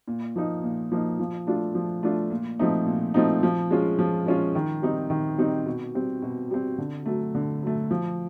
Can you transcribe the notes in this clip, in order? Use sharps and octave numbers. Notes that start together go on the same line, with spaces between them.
A#2
F3 A#3 D#4
A#2
F3 A#3 D#4
F3
A3 D4 F4
F3
A3 D4 F4
A#2
F3 A3 C4 D#4
A#2
F3 A3 C4 D#4
F3
G#3 C#4 F4
F3
G#3 C#4 F4
D#3
G3 C4 D#4
D#3
G3 C4 D#4
B2
G3 C4
B2
G3 C4
D3
F#3 A3
D3
F#3 A3
F3